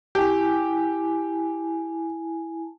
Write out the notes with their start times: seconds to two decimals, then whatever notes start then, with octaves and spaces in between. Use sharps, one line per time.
0.15 E4 G4 G#5 A5